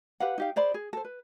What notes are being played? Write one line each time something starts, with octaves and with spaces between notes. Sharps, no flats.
G4 B4 F5 F#5
D#4 G4 F5
G#4 C5 D5 B5
G#4
A4 C5
B4